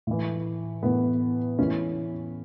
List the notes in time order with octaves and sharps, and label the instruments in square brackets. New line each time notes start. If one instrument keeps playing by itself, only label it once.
[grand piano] A2 E3
A2 E3 B3
A2 E3 C#4